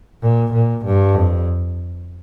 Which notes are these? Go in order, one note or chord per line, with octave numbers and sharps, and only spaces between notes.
A#2
A#2
G2
F2